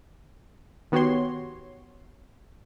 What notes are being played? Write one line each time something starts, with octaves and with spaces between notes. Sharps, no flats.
D#3 B3 F#4 G4 C#5 C6